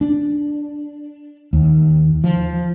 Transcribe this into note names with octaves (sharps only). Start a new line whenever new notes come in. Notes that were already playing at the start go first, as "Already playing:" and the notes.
D4
D#2
F3